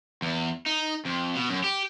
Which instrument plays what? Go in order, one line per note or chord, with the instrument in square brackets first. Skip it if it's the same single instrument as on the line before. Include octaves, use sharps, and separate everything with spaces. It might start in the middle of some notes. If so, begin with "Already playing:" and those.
[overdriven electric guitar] E2
D#4
F2
B2
F#2
G4